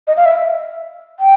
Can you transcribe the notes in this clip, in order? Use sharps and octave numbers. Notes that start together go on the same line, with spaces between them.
D#5
F5
E5
G5